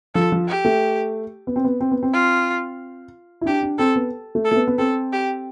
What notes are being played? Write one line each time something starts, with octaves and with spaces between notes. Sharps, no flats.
F3 A4
F3
G4
A3
B3
C4
B3
C4
B3
C4
F4
E4
D4 G4
D4
C4 A4
B3
A3
A4
A3
B3
B3
C4 A4
G4